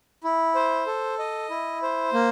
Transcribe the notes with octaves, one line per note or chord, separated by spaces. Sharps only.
E4
C5
A4
D#5
E4
C5
A#3